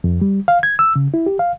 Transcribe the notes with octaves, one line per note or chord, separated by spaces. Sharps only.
F2
G3
F5
G#6
E6
C#3
E4
G4
F5